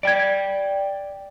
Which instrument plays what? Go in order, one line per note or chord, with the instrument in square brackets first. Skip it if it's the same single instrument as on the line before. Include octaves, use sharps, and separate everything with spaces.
[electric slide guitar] D5 G5 [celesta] G#6 D7